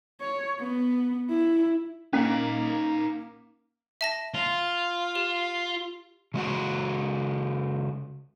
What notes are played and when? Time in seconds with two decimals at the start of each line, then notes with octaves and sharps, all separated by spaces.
0.21 C#5
0.60 B3
1.30 E4
2.13 A#3 C#4 D#4 F#5 B6
4.01 E5 A5 A#6
4.34 F4
5.15 G4
6.34 C#3 G#3 F#4 F#5